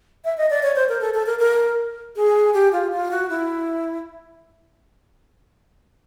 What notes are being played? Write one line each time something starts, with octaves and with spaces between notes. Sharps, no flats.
E5
D#5
D5
C#5
C5
A#4
A4
A4
A#4
A#4
G#4
G4
F4
F4
F#4
E4